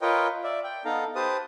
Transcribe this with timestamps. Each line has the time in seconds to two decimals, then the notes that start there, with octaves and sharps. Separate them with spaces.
0.01 F4 A#4 B4 C#5 D#5 G5
0.44 D5 E5
0.64 G5
0.85 B3 D#4 A4 F5 A#5
1.15 G4 B4 C5 A5 D#6